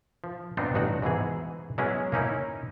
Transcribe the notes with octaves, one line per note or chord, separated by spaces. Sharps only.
F3
B3 C4 D4 D#4 F4
A1 G2 D#4 F#4 F#5
G#2 B2 E3 G#4
F#3 G#3 B3 C#4 E4 G#4
A#3 C#4 D#4 E4